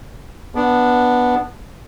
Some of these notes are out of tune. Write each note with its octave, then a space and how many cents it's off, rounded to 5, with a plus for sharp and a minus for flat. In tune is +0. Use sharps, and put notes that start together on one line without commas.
B3 -5 D4 +0